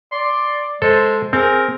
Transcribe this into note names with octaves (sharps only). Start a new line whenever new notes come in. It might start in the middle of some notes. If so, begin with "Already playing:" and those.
D5 C6
G#3 A4 C5
C4 G#4 A#4